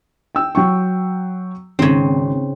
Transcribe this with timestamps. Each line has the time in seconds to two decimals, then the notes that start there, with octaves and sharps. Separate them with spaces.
0.35 G5 E6
0.55 F#3 G5 C#6
1.79 G#1 C#3 C4